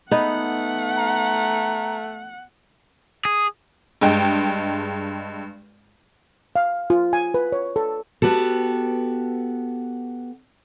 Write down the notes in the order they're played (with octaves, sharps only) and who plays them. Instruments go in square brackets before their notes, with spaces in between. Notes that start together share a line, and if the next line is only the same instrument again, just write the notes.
[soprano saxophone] A3 [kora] B3 D#4 [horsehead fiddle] F#5
[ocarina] A#5
[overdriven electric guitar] G#4
[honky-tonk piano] G2 G#3 G5
[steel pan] F5
F4
G#5
B4
C#5
A4
[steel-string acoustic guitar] B3 F#4 G4 A4